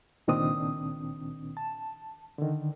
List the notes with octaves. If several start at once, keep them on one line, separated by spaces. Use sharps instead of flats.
C#2 A#2 D#3 C4 D4 D#6
A5
D3 D#3